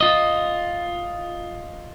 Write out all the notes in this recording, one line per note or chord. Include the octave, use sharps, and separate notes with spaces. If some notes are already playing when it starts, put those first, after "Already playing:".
F4 D#5